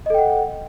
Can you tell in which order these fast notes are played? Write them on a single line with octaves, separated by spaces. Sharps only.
D#5 A4 G5 F#5